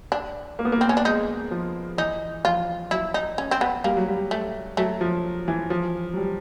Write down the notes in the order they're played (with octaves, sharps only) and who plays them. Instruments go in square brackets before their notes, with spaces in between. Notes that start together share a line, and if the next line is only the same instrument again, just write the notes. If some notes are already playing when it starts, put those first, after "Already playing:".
[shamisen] D4
[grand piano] A#3
B3
A#3
[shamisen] C4
C#4
D4
[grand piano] G#3 [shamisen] D#4
[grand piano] F3
[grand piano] E3 [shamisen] D#4
[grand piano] F3 [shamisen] F4
[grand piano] F#3 [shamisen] E4
[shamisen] D#4
C#4
C4
B3
[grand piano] G3 [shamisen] A#3
[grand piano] F#3
G3
[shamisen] A3
[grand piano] F#3 [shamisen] A3
[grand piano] F3
E3
F3
F#3
G3